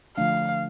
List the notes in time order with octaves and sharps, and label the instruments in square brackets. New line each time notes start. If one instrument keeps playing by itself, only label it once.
[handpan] D3 F3 A3 D4 [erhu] F5